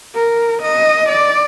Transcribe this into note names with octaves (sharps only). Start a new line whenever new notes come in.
A#4
D#5
D5